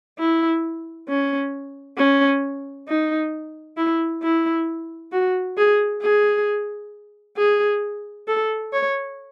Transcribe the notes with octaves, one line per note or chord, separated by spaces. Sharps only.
E4
C#4
C#4
D#4
E4
E4
F#4
G#4
G#4
G#4
A4
C#5